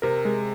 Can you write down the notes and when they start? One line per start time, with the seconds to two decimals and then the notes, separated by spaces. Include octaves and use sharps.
0.02 C3 A#4
0.25 G#3